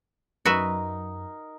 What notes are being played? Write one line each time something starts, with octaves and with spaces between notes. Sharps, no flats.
F#2 D#4 F#4 A#4 B4 E5